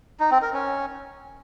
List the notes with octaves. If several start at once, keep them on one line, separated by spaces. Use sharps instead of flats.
D#4
C4
A#4
C#4